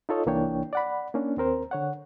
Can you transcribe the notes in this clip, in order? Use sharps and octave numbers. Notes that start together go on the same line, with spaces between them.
D#4 F4 A4 C#5 D#5
C2 E3 A#3 D4 C#5 G5
D5 F#5 B5
A#3 C#4 D4
D#2 C4 A#4 C5
D3 C#5 F#5